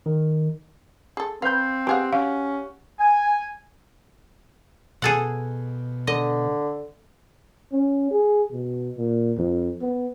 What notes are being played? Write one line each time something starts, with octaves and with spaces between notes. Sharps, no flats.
D#3
G#4 A4
C4 B4 F5 B5 G6
B3 G4 G#4 F5 F#5
C#4 F#4 F5
G#5
B2 G#4 A4 F#5
D3 D#5
C#4
G#4
B2
A#2
F2
B3